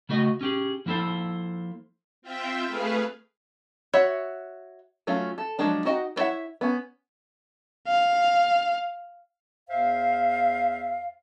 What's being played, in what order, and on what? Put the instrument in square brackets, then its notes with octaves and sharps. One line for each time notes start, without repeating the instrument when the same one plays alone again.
[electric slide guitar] C#3 A3 F#4 D#5
C#4 G4 G#4
F3 A#3 E4 A4 C5
[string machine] C4 F4 E5 G5
A3 G#4 B4 F5
[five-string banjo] F#4 C#5 E5
F#3 A3 C#4 F4
A4
F3 F#3 G#3 D4
D#4 F#4 D#5 F#5 G5
B3 E4 C#5 E5 F#5
B3 C#4
[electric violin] F5
[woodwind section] E2 C5 E5 F5